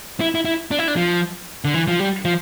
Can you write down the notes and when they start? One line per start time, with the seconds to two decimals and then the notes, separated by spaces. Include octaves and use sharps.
0.20 E4
0.35 E4
0.45 E4
0.71 D4
0.79 E4
0.88 D4
0.96 F3
1.65 D3
1.74 E3
1.88 F3
2.00 G3
2.25 F3